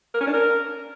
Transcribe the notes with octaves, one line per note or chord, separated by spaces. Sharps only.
A#4
C#4
D4
A#4